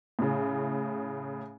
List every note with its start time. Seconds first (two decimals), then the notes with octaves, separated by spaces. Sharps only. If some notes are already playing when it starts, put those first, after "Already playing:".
0.19 A2 C#3